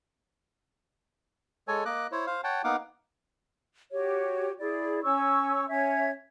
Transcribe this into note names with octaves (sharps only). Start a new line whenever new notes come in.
G#3 A4 C#5 G#5
A#3 D#5 D6 F#6
E4 C5 C#5
C5 F5
C#5 F#5 G5 A5
A#3 B3 D#4 F5 F#5 D6
F#4 G4 C#5
E4 G#4 D5
C#4 C#5 C#6 E6
C#4 C#5 E5 G#6